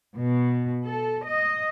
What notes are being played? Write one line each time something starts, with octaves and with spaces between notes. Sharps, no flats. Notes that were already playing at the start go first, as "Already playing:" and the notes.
B2
A4
D#5